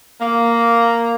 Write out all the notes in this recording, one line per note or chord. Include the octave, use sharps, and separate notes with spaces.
A#3